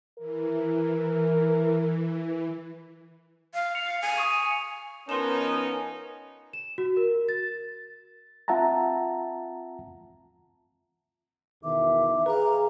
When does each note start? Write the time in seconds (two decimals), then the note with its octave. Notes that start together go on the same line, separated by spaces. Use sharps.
0.19 E3 A#4
3.54 F5
3.75 C#7 F7
4.02 G#5
4.18 C#6 D#6 D#7
5.09 F3 B3 C#4 D#4 A#4 B4 C6 E7
6.53 E7
6.78 F#4
6.97 A#4
7.29 A6
8.48 C4 F4 E5 F#5 A5 A#5
11.64 E2 B2 D#3 E5 D6
12.26 G#4 B4 F5 A#5